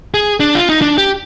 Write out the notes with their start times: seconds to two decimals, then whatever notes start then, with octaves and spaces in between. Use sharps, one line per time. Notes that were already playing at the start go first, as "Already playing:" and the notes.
0.14 G#4
0.40 D4
0.55 F4
0.69 D#4
0.82 D4
0.98 G4